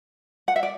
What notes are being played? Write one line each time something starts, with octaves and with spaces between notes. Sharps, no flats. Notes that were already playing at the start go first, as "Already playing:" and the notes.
F#5
E5
D5